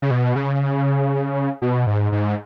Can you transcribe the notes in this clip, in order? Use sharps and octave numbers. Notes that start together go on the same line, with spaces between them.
C#3
B2
C#3
B2
G#2
G#2